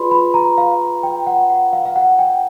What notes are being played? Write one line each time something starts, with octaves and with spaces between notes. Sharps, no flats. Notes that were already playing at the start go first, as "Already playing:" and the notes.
Already playing: F4 G#4 B4 D5 B5 C6
B5
A#5
F5
G5
F#5
F#5
F5
F5
F#5
G5